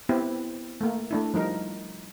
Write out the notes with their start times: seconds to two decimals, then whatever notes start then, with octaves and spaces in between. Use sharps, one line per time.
0.09 B3 C4 E4 G4
0.81 A3 A#3
1.11 A3 D4 E4
1.34 F3 G3 D#4 A#4